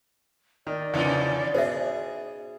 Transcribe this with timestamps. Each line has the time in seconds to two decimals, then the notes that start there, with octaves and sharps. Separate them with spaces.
0.67 D#3 D5
0.94 E2 C3 F3 C#4 D#4
1.55 B2 G#4 C5 E5